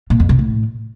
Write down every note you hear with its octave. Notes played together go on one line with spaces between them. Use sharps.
A#2
F2
C3
A2